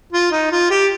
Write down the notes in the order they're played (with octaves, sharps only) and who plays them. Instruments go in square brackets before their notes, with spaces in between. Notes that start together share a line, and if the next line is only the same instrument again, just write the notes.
[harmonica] F4
D#4
F4
G4